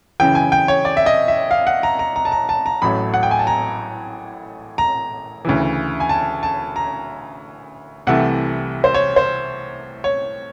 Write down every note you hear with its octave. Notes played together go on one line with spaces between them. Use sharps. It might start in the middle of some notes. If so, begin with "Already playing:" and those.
F#2 C#3 E3 G5
G#5
G5
C#5
D5
E5
D#5
E5
F5
F#5
A#5
A#5
A#5
A5
A#5
A5
A#5
A1 A2 F#3 A3 B5
F#5
G5
G#5
A5
A#5
A#5
D2 C#3 E3
G#5
A5
A5
A#5
C2 C3 E3 A3 F#5
C5
C#5
C5
C#5